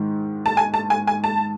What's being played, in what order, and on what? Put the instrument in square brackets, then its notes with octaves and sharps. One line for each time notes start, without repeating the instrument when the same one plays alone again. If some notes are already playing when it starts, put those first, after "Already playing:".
Already playing: [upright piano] G#2 D#3
[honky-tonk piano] A5
G#5
A5
G#5
G#5
A5